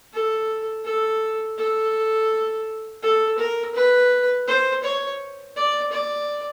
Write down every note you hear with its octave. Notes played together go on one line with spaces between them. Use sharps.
A4
A4
A4
A4
A#4
B4
C5
C#5
D5
D5